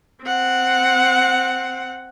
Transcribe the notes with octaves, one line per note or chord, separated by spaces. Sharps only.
C4 F#5